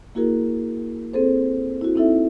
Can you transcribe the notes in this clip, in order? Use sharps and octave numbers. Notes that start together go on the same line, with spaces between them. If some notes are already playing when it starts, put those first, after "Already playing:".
A#3 E4 F#4 G#4 A#4
C4 G#4 A4 C5
E4 F#4
C4 D#4 E4 A4 E5